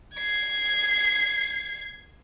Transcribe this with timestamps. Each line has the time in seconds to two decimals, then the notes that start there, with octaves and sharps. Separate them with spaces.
0.16 G#6 C7